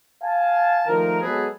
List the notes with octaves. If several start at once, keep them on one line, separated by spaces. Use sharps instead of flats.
F5 G#5 A5
D#3 F3 A3 A#4
F#3 G#3 B3 G#4 A4 B4